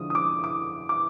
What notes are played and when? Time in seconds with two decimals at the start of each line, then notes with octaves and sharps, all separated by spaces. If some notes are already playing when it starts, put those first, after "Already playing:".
Already playing: D3 F3 G#3 D#6
0.10 D#6
0.15 D6
0.44 D6
0.89 D6